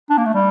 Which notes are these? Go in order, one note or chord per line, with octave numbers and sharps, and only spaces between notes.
D4
A#3
A3
G3